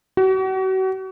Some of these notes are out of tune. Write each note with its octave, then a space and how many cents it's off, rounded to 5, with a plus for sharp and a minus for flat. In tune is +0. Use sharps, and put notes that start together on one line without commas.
F#4 +35